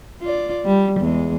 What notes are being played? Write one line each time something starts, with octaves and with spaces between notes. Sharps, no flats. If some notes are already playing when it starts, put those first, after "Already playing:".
F4 D5
G3
E2 G#3